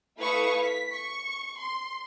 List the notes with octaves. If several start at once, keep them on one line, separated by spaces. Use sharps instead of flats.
A3 E4 B4 F5 C#6 D#6
B6
C#6
C6